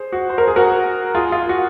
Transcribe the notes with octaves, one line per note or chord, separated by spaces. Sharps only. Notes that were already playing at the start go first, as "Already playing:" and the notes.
Already playing: G#4 C5
F#4
C5
A#4
G#4
F#4 A#4
F4 G#4
F4
F#4